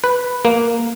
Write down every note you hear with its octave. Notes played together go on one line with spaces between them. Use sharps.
B4
A#3